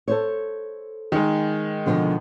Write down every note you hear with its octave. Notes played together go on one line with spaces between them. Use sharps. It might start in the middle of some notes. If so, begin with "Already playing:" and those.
A4 C5 C#5
D#3 G#3
B2 D3 F3